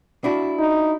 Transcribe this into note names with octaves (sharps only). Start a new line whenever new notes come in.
D4 E4 F#4
D#4